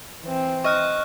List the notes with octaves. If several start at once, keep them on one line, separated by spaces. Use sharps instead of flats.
E3 C4
D#5 C#6 F6 F#6